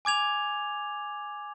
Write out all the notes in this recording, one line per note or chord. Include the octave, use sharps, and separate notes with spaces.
G#5 D6 G#6 F7